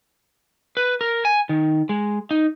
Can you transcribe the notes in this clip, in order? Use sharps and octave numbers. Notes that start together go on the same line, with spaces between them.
B4
A#4
G#5
D#3
G#3
D#4